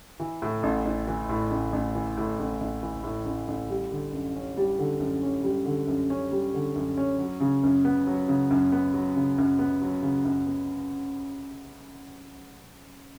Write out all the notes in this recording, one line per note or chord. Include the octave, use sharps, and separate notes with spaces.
E3
A2
A1
A1
E3
A2
A1
A1
E3
A2
A1
A1
E3
A2
A1
A1
G3
D3
F#2
C#4
G3
D3
F#2
C#4
G3
D3
F#2
C#4
G3
D3
F#2
C#4
F#3
C#3
F#2
B3
F#3
C#3
F#2
B3
F#3
C#3
F#2
B3
F#3
C#3
F#2
B3